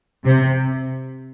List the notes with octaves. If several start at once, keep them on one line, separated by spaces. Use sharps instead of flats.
C3